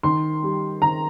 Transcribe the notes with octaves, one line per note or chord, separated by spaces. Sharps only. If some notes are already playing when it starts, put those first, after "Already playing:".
D#3 C6
G3
D#3 A#5